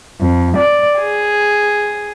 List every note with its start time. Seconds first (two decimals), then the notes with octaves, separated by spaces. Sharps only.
0.20 F2
0.57 D5
0.99 G#4